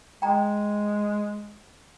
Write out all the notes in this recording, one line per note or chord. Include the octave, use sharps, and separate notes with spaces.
G#3 G5 A#5